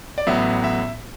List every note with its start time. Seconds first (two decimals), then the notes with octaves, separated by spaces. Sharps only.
0.18 D5
0.27 A1 A2 F#3 B3 E5
0.64 E5